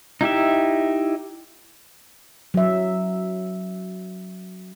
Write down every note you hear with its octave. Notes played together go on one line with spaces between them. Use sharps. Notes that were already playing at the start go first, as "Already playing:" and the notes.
D#4 E4 G4 E5
F#3 E5